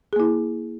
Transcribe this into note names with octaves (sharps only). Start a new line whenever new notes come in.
A#3 E4 G#4